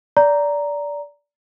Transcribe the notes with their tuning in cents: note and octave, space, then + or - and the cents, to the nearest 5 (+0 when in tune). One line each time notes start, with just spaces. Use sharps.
D5 -15 A#5 +0